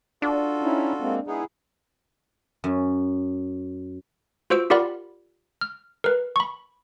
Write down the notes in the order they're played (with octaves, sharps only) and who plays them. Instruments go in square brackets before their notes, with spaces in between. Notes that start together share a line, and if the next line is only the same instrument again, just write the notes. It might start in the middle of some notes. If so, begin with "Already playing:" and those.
[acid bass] D4 [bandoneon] F4 F#4 A4
[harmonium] C#4 D#4 E4
G#3 A#3 C4
[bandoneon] G#3 B3 D#4 [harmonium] E4 G#4
[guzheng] F#2
[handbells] F4 F#4 C5 E6 D7
F4 G4 A#4 D5 F#5 B5
F6
A#4 B4
B5 C#6